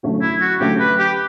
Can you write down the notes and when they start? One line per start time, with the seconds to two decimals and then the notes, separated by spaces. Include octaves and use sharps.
0.03 D3 F#3 A3 C#4 F#4
0.22 E4
0.41 F#4
0.60 D3 F#3 A3 C#4 F#4 G4
0.80 B4
0.99 G4